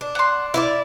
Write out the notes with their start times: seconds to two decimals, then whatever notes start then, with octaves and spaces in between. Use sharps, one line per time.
0.01 D4
0.15 F#5 C6
0.54 E4 F4 D5 F5